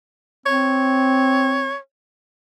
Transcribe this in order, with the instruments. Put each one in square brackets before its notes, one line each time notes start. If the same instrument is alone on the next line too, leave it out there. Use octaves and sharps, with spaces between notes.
[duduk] C4 [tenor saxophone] C#5